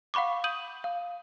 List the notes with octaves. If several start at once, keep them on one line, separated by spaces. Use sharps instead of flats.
F5 F#5 B5 C#6 D6
D#6 G6 D#7 F#7
F5